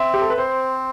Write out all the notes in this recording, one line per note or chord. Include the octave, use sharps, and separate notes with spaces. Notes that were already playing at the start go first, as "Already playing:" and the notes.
Already playing: C4 E5
G4
A4
B4
C4 C5